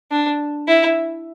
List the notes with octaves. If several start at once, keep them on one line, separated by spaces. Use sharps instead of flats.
D4
E4